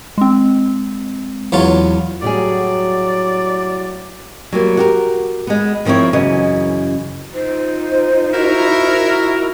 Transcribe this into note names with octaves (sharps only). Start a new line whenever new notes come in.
G#3 C4
E2 F#3 F4
A2 F#3 G3 G#4 D5
F#3 G3 A#3
F#4 G4 A#4
G#3 B3
D#3 F3 C4 E4 C#5
F#2 C#3 E3 D#5
D#4 F4 C5
E4 F#4 A#4